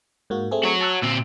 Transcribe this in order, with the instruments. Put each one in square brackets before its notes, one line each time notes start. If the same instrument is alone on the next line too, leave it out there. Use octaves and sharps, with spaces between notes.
[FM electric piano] G#2 A#3 F#4
A3 C4 G#4
[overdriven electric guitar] F#4 C#5
[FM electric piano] A5 E6 F#6
[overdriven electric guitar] A#2 C4 [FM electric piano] E6